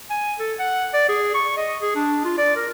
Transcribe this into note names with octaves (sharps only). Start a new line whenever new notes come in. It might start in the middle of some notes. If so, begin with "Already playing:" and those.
G#5
A4
F#5
D5
G#4
C#6
D#5
G#4
D4
F4
D5
A#4